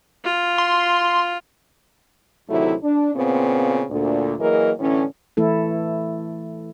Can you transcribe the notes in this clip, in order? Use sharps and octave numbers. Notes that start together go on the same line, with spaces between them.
F4
C6
D2 C3 D#3 F#3 A3 E4
D4
A#2 C#3 B3 C4
D2 A#2 D3
E3 F#3 A#3 G#4 A#4 D#5
A2 D3 E3 C#4
E3 A3 E4 A4